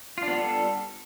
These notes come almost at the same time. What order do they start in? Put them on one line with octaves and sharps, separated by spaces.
F4 D4 B3 G3 A4